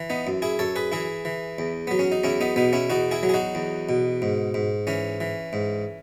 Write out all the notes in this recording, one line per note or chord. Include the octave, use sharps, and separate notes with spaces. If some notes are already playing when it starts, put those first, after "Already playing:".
Already playing: E3
B3 D#4
F#2
E4 G#4
F#2 A4 C#5
G#4 B4
E3 E4 G#4
E3
E2
F#3 B3
C#4
D#4
E2 C#4 E4
B3 D#4
B2 B3 D#4
C#4 E4
E2 D#4 F#4
E4 G#4
F#3
G#4
D#4 F#4
E2
B2
G#2
G#2
E3 C#4
E3
G#2